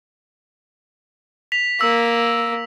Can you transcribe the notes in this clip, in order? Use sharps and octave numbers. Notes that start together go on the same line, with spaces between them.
B6 F7
A#3 E6